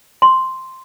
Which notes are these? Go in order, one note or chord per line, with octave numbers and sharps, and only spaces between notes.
C6